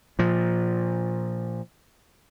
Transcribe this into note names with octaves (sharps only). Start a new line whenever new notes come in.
A#2 F3